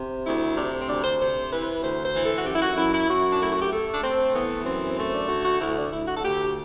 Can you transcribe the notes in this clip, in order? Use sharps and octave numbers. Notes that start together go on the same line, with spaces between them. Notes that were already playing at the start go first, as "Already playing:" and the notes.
Already playing: C3
D2 E4
C3 D4
C4
D2 D4
C5
C3 C5
E3 B4
D2 C5
C5
E3
A4
F#4
F#2 G4
E4
F#4
F#2 E4
E4
F#2 F#4
D4
A3 E4
F#4
G4
A3 A4
D4
A3 C4
E3 B3
F#2 C4
A3 C4
D4
D3 F#4
F#4
D2 E4
D4
D2 E4
F#4
A4
D2 G4